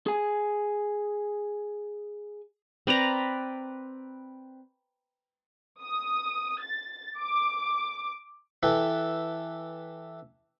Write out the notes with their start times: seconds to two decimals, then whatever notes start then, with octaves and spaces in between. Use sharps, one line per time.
0.06 G#4 G#5
2.87 C4 B4 D5 A#5
5.81 D#6
6.60 A6
7.19 D6
8.63 E3 E4 G4 A4 B4